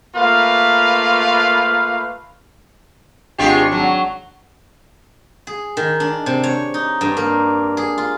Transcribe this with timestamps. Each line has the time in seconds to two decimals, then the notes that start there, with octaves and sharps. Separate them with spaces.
0.16 A3 A#3 F4 B4 F5
3.38 G#1 G#3 D4 F4 G4 C#6
3.72 F#3
5.47 G#4
5.77 D#3
6.00 D4
6.26 C3
6.43 C#5
6.74 D#4
7.01 G2
7.17 A#3
7.77 G#4
7.98 F4